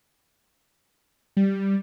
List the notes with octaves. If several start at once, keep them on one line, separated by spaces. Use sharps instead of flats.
G3